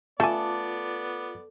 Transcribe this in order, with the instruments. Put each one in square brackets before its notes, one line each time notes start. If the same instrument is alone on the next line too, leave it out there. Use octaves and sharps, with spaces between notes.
[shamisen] A3 G#5 [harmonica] B3 D5 [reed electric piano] F4 D6 [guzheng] A4